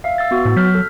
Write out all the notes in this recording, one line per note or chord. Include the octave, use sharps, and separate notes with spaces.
E5 F5
E6 A6
B3 F#4
A2
F#3 F6 G6 B6
A4